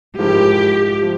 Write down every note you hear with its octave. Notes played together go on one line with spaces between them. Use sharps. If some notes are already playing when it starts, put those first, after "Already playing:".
G#2 F3 G#3 E4 G4 A#4
F3